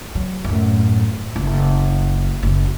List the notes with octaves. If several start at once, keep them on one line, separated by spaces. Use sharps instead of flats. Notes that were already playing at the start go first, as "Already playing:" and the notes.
F#3
F#2 A2
F#1
F#1